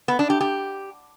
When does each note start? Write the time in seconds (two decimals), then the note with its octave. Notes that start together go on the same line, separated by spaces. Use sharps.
0.08 B3
0.19 D4
0.30 G4
0.41 G4